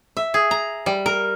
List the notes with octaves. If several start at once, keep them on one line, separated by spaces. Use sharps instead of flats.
E5
G#4
A#5
G3
A#4